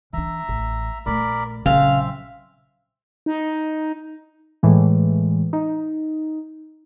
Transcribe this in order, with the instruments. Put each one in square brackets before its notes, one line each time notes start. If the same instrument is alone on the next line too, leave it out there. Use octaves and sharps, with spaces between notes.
[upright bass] E3 D4 [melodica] E5 A#5
[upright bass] A1
[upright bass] A#1 A3 [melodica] A#4 D5 B5
[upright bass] A#1 F#3 [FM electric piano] C#3 [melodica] C4 E5 [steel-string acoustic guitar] F5
[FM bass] D#4
[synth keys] A2 E3 G#3
D#4